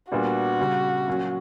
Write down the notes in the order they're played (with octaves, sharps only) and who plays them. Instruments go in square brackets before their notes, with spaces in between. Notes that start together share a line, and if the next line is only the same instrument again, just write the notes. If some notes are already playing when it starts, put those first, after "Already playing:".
[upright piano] A#2 G3 B3 D4 [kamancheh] F#4
[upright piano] C#3 G3 C#4
A#2 F#3 C#4